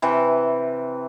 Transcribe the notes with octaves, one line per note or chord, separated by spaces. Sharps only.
C3 E3